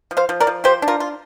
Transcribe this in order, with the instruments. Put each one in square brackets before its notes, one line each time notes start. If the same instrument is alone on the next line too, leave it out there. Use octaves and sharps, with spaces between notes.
[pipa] F3
C5 F5
F3
A#4 D5
F3
F4 G4 C5
D4
F4 A#4
F4